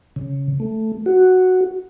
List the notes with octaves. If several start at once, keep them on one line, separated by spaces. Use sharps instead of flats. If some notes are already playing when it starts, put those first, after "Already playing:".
C#3
A3
F#4